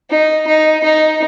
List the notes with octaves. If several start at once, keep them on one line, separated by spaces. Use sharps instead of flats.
D#4
D#4
D#4